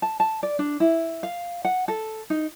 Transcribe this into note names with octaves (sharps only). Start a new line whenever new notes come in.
A5
A5
D5
D4
E4
F5
F#5
A4
D#4